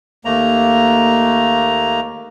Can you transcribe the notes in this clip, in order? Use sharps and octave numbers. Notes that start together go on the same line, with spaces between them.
D#2 A3 A#3 A#5